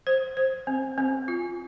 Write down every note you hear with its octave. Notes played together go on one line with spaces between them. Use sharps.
C5
C5
C4
C4
F4